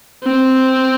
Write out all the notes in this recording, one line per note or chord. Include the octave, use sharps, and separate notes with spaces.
C4